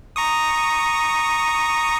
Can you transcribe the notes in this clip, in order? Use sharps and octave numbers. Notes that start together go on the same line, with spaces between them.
A#5 C#6 D#6